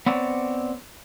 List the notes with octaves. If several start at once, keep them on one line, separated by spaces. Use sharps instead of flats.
B3 C4 C#5 D5